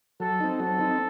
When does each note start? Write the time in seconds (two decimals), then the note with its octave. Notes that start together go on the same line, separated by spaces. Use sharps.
0.20 F#3 A4
0.40 C4 D#4
0.59 F#3 A4
0.79 C4 D#4